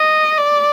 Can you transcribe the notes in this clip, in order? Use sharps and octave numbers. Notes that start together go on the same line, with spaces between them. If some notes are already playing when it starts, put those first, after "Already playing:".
Already playing: D#5
D5